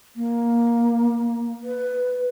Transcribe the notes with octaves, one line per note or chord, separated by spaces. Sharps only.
A#3
B4